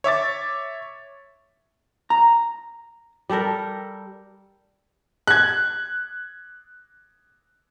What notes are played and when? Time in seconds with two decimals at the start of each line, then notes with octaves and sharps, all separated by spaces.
0.04 C#5 E5 D6 A6
2.10 A#5
3.30 G3 G4 A4 A#4
5.27 F#6 G#6